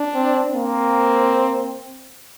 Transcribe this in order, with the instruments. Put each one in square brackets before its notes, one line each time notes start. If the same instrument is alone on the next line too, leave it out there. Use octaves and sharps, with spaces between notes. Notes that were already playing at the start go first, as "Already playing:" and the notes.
Already playing: [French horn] D4
[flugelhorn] C4
[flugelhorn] A#3 [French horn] C4